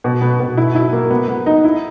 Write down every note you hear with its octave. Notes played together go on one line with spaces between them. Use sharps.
B2
B3
B2
E4
E4
A#3
B3
B3
D#4
E4